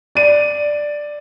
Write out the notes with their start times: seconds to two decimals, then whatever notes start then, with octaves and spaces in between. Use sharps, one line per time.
0.15 D5 D#7